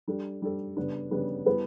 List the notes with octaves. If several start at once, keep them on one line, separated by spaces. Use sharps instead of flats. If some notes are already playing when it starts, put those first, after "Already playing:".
G3 D4 A4
G3 D4 A4
C#3 G3 B3 D4
C#3 G3 B3 D4
G3 B3 E4 B4